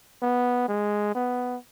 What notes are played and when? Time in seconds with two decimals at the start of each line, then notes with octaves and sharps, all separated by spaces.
0.22 B3
0.68 G#3
1.15 B3